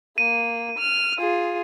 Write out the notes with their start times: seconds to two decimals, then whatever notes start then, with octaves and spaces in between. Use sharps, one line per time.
0.18 A#3 D#7
0.79 F6
1.19 F4 G#4